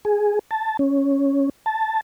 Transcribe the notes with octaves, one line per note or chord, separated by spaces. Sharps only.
G#4
A5
C#4
A5